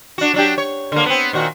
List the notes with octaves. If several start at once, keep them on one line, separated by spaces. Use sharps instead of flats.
D4 F#4
F#3 D4 G4
C#5
D3 A#3
B3 C4
A#2 D#3 F#4